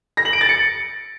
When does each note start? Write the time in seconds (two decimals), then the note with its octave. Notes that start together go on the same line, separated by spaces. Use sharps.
0.17 A#6
0.25 F#7
0.33 D7
0.41 A6
0.49 C#7